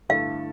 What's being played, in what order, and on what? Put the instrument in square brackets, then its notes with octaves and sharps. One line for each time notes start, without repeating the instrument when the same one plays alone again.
[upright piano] G2 D3 A3 E4 A4 [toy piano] F5